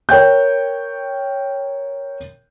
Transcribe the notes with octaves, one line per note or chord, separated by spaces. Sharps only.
A#4 C#5 G5 G6